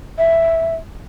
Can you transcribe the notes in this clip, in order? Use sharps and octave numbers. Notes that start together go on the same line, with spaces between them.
E5